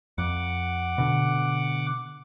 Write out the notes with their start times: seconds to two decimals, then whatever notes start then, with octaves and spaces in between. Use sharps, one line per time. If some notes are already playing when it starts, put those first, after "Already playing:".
0.18 F2 F#5 D6
0.98 B2 D3